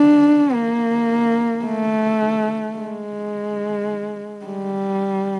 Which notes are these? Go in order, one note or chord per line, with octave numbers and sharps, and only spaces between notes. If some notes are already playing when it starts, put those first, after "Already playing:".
Already playing: D4
A#3
A3
G#3
G3